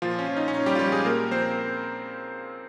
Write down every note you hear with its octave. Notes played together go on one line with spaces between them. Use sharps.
A#2 F3 F4
C#4
F3
D#4
C#4
A#2 D#4
G3 G4
F4
F3 G3 G4
G#3 G#4
A#2 A#3 A#4
F3 C4 C5